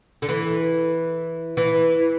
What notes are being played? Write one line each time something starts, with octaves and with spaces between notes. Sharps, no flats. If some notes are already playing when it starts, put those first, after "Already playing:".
D3
E3
E3